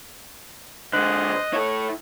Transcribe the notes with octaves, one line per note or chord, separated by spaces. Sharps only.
D3 G#3 C5 D#5 F#6 F#7
E4 A4 C#5